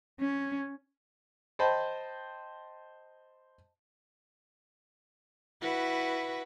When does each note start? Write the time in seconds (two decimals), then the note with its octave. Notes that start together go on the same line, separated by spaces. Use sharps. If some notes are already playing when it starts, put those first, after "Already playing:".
0.20 C#4
1.59 C5 D#5 G5 A5 B5
5.61 E4 F#4 B4